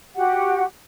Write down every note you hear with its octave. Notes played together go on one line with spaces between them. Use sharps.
F#4 G4 F#5